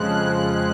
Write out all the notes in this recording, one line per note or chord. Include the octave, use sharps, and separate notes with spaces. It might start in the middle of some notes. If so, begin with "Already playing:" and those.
Already playing: F2 C#3 F3 G#3 F#6